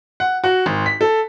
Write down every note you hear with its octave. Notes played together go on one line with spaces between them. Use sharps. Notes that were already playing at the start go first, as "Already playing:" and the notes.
F#5
F#4
G#1
B6
A4